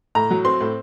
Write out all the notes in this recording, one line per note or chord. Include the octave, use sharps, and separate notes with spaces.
A2 A#5
F#3
C4 C6
A2